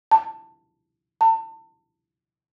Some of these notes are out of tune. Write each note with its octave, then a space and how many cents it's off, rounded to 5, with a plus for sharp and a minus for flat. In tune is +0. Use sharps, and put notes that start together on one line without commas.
A5 +15
A5 +35